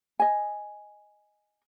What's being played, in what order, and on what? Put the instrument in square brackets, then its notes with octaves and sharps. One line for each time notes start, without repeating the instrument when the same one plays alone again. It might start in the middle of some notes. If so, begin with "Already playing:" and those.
[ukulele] D#5 G#5